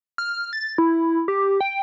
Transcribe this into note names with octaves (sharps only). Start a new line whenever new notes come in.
F6
A6
E4
G4
G5